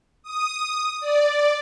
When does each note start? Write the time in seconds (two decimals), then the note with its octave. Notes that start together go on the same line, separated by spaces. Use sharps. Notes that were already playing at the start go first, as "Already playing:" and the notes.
0.23 D#6
1.00 D5